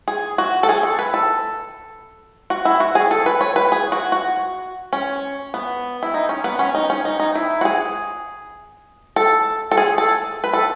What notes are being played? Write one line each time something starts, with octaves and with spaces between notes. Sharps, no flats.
G#4
F#4
A4
G#4
A4
B4
A4
F#4
E4
F#4
G#4
A4
B4
C#5
B4
G#4
F#4
F#4
C#4
B3
E4
D#4
C#4
B3
C#4
D#4
C#4
D#4
D#4
E4
F#4
G#4
A4
A4
G#4
A4
B4
A4